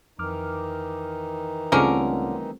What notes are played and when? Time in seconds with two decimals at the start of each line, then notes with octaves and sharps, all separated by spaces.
0.19 F2 D#3 E3 D#4 D6 F6
1.72 C#2 D3 G3 A3 C4 C#4 A#4